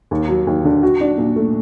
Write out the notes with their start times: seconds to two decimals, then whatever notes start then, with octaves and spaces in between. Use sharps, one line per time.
0.11 D#2
0.29 F#3
0.47 D#2
0.65 D3
0.83 F#4
1.01 D4
1.18 A#2
1.36 A3